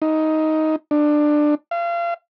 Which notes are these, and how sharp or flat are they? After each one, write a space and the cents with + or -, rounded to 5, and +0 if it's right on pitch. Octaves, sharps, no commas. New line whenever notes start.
D#4 +10
D4 +20
F5 -30